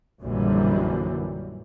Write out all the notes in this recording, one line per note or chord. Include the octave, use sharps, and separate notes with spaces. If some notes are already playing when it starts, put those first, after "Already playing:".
A#1 F#2 D3 E3 G3 A#3